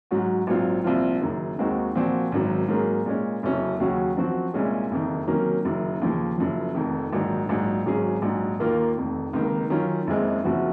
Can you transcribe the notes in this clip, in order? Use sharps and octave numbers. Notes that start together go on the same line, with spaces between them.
G#2 F#3 C#4 F#4
A#1 G#2 F#3 C4 F4
C2 A#2 F3 C4 F4
F#1 F#2 D#3
D#2 D#3 G#3 C4 F#4
A#2 F3 C4 F#4
G#1 F#2 D#3 F#3
G#2 F#3 A#3 C#4 G#4
A#2 G#3 C#4
F#1 F2 C3 F#3 C#4
D#2 C#3 F#3 C#4 F#4
F#2 F3 C4 F#4
C2 A#2 G#3 C#4 G#4
F#1 F2 D#3
C3 D#3 F#3 A#3 C#4
F#1 F#2 D#3
D#2 C#3 F3
F#1 F#2 F3
F1 F2 D#3
A#1 G#2 D#3 F#3
A#1 G#2 F#3
G#1 G#2 F#3 C#4 G#4
A#1 G#2 F#3
D#2 D#3 A#3 F4
F1 F2 D#3
C#2 C3 D#3 A#3
F#2 D#3 F#3 C#4 F4
F#1 F2 C#3 G#3 C4
F#1 F#2 F3 C4 F#4